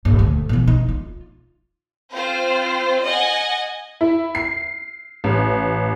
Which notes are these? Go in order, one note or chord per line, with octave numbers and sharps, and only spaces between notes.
D#1 G2
D2
B2 E3
D#4
F4
C4 F4 C5
D#5 F#5 G#5
E4
C7
A1